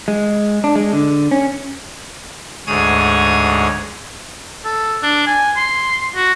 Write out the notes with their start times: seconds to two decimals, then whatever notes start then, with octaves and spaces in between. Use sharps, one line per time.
0.08 G#3
0.64 D4
0.76 G#3
0.93 D3
1.31 C#4
2.67 D2 G#2 G#4 C#5 D#6 G#6
4.65 A4
5.02 D4
5.27 G#5
5.57 C6
6.16 F#4